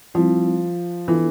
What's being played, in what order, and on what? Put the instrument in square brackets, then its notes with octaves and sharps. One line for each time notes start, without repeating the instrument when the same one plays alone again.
[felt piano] F3 [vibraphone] G3 C4 E4
[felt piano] E3 [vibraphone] B3 D4 F4 A4